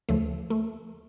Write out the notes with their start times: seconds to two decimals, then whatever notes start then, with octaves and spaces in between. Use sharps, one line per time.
0.09 D2 C#3 F3 A3
0.50 A3